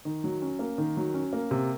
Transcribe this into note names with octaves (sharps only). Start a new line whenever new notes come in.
D#3
F#3
C#4
A#3
D#3
F#3
C#4
A#3
C3